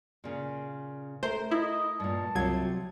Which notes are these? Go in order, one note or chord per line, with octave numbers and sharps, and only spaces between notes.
A#2 C#3
A3 A#4 C5
E4 D#5
G2 A#2 A5
C2 C3 F#3 F4 G#6